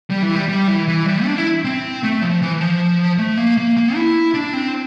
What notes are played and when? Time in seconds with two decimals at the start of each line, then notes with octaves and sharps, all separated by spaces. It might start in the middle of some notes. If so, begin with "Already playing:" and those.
0.10 G3
0.22 E3
0.35 G3
0.48 G3
0.68 E3
0.88 E3
1.06 G3
1.25 D4
1.38 E4
1.64 C4
2.03 A3
2.21 F3
2.42 E3
2.60 F3
3.18 A3
3.38 A#3
3.57 A#3
3.77 A#3
3.95 E4
4.34 D4
4.53 C4